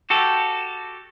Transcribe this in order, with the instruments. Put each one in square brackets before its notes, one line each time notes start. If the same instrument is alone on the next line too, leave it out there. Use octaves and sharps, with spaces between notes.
[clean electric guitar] F#4 G4 A4